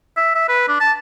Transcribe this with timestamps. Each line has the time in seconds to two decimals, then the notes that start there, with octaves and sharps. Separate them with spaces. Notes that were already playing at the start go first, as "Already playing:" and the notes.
0.17 E5
0.35 E5
0.48 B4
0.69 D4
0.80 A5